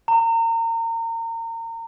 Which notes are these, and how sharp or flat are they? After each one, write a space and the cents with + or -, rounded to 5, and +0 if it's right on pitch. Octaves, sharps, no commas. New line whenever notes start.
A#5 -30